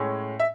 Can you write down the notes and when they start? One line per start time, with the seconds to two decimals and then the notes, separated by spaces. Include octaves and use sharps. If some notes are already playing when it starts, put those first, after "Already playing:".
Already playing: A2 G#3 C#4
0.40 E5